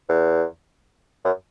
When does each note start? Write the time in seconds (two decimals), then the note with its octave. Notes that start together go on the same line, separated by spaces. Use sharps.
0.09 E2
1.25 F#2